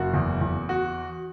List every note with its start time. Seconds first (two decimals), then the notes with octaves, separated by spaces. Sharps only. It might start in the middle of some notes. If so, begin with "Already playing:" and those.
Already playing: F#1 F#4
0.13 E2
0.41 E2
0.69 F#4